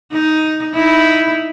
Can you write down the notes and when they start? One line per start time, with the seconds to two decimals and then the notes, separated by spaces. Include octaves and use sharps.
0.12 D#4
0.73 D#4 E4